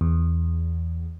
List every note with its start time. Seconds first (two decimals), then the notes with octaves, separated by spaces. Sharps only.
0.01 E2